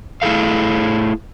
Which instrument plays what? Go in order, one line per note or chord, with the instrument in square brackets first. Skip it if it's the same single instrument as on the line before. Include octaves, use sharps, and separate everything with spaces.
[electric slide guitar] A3 E4 G#4 A4 F5